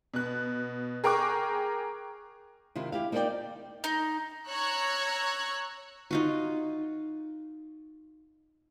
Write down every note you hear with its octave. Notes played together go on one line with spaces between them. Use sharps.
B2 F#6
G#4 A#4 G5 C#6 D6 F#6
C3 D#3 E4 F4
E4 G4 F5
A#3 D#4 F4 C#5 D5 G5
D#4
C#5 A#5 C#6 E6 F#6 G#6
D#4 F4 F#4